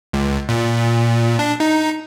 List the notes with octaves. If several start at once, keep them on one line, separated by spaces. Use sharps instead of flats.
C#2
A#2
D4
D#4